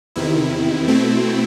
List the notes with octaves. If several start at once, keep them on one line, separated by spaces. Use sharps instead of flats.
E2 C3 D#3 E4
B2 A3 C4